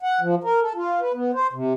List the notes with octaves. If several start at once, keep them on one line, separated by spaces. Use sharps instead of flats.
F#5
F3
A#4
A4
F4
B4
B3
C5
C3